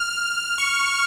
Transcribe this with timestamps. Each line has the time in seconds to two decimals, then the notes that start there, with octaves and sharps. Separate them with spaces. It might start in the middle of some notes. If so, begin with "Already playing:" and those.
Already playing: F6
0.58 C#6